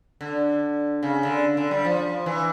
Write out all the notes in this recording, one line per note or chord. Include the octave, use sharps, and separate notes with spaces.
D3
C#3
D3
D3
G3
F3
E3